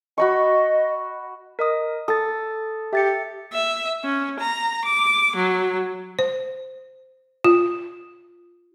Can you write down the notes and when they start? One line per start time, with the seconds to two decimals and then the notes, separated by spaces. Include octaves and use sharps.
0.18 F#4 D#5 B5 C#6
1.59 A#4 D#5 D#6
2.08 A4 D#6 A6
2.93 G4 E5 A6 C#7
3.53 E5
4.04 C#4
4.40 A#5
4.85 D6
5.36 F#3
6.19 C5
7.44 F4